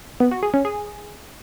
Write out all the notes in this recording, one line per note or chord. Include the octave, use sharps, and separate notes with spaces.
B3
F#4
G#4
C#4
G#4